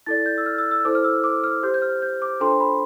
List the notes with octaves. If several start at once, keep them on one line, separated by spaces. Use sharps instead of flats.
E4 A4 D5 A6
G6
E6
F6
E6
E6
E4 A4 C5 D6
F6
E6
D6
F6
G4 C5 G6
G6
F6
G6
D6
D4 F4 A4 C5 C6
B5